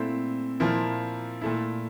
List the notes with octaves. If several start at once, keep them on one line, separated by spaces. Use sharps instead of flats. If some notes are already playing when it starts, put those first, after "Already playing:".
Already playing: A#2 A3 C4 E4
A#2 F3 A#3 E4
A#2 A3 E4